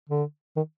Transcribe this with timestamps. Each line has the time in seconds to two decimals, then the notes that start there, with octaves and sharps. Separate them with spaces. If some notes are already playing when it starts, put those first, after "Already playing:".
0.09 D3
0.56 D#3